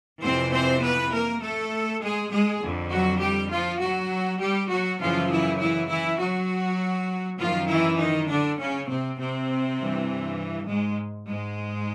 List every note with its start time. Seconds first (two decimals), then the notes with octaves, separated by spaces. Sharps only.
0.22 F2 C3 E3 C4 C5
0.52 C4 C5
0.82 B3 B4
1.12 A#3 A#4
1.42 A3 A4
2.02 G#3 G#4
2.32 G#3 G#4
2.61 F2 D3
2.91 F#3 F#4
3.21 G3 G4
3.51 F3 F4
3.81 F#3 F#4
4.41 G3 G4
4.70 F#3 F#4
5.01 F#2 C#3 E3 F3 F4
5.30 E3 E4
5.60 E3 E4
5.90 E3 E4
6.19 F#3 F#4
7.39 F#2 D#3 F3 F4
7.69 E3 E4
7.99 D#3 D#4
8.29 D3 D4
8.59 C#3 C#4
8.88 C3 C4
9.18 C3 C4
9.78 G2 E3
10.68 G#2 G#3
11.28 G#2 G#3